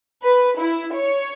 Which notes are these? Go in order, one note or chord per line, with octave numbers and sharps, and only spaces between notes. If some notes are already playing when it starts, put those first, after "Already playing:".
B4
E4
C#5